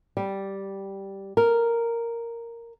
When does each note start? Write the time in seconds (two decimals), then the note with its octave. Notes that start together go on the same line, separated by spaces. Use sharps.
0.17 G3
1.37 A#4